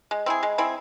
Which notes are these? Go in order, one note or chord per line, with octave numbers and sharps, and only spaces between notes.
G#3
C4 E4 G#4
G#3
C4 E4 G#4